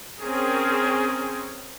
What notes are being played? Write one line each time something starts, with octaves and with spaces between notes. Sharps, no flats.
C4 C#4 G#4 A#4